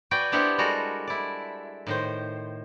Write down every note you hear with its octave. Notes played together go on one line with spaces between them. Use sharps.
F#4 B4 D5 G5 G#5
B3 D4 E4 G4 C5 F#5
G3 G#3 F#4 A4 A#4 F#5
E4 D5
A2 D#3 C5